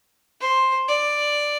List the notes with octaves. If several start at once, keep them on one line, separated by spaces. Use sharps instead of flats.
C5
D5